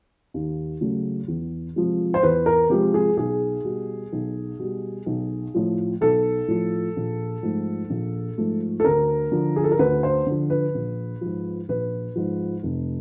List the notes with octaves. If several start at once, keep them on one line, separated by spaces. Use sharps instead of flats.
D#2
C#3 F#3 A3
E2
C3 F3 G#3
C5
E2 B4
A#4
C3 F3 G#3 G4
G#4
B1 G#4
B2 G3
B1
B2 G3
B1
A2 F3
B1 A4
A2 F3
A#1
G#2 F3 A3
A#1
G#2 F3 A3
A4
D2 A#4
D3 F3
G#4
A4
A#4
D2 B4
C5
D3 F3
B4
A#1
G#2 F3
A#1 B4
G#2 F3
F1